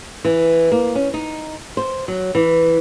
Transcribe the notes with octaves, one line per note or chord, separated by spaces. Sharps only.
E3
A#3
C#4
D#4
C5
F#3
E3